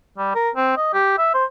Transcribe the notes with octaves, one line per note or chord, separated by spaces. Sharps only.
G3
A#4
C4
D#5
G4
E5
C5